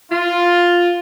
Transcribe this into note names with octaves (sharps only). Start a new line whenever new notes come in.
F4